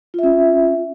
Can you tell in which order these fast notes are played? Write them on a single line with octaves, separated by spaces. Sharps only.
F4 E5 C#4